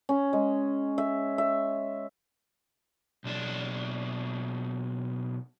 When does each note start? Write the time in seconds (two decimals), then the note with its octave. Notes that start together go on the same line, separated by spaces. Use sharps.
0.09 C#4
0.33 G#3
0.98 E5
1.38 E5
3.24 B1 D4